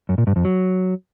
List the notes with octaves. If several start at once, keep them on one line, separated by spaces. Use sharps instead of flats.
F#2
A#2
G2
F2
F#3